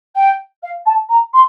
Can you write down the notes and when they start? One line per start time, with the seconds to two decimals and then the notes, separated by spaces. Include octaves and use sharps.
0.15 G5
0.63 F5
0.86 A5
1.09 A#5
1.33 C6